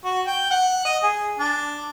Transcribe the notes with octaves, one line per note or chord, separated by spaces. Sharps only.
F#4
G5
F#5
D#5
G#4
D4